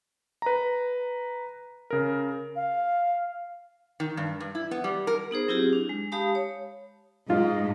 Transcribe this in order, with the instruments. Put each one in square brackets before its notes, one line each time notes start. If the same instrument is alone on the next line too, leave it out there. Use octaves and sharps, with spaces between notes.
[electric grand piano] B4 A#5
C#3 A#4
[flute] F5
[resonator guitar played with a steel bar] D#3
G2
G2
E4
B3
G3
A#4
[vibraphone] B3 D#4 G#4 C5
F#3 C4 E4 F4 G4 G#4
D4
G#3
G#3 G4 F5 A5 B5 D#6
C#5
[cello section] G#2 [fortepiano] F4